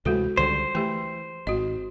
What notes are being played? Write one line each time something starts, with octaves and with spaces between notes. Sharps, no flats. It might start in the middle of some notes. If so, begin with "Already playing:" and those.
D2 C3 E3 G#3 F#4 A4
C#2 D3 G3 C5
E3 A3 G4
G#1 F#4 D#5